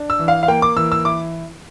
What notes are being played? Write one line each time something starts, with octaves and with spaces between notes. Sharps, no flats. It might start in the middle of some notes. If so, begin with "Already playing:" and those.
Already playing: D4
E6
E3
F5
F5
A#3 G5
D6
E3 E6
E6
E4 D6